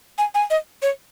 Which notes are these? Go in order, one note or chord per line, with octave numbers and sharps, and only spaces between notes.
G#5
G#5
D#5
C#5